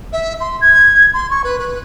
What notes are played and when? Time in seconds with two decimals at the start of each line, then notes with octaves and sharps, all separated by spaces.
0.12 E5
0.40 C6
0.61 G#6
1.13 C6
1.30 C#6
1.44 B4
1.59 B4